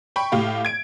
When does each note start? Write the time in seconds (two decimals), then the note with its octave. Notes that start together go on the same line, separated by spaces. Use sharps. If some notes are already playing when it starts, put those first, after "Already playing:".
0.16 G5 B5 C#6
0.32 A2 G4 F5
0.65 G#6 D7